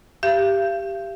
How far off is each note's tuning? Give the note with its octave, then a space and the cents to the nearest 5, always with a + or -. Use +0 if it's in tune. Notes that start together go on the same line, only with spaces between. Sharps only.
G4 +0 F5 -45